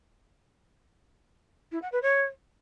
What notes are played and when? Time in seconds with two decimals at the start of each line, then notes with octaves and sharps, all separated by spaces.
1.71 E4
1.82 F#5
1.92 B4
2.02 C#5